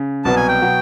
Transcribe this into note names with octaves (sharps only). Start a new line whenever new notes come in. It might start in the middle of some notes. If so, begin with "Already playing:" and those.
Already playing: C#3
C2 B2 F#3 B3 A5
G#5
G5
B2 F#3 B3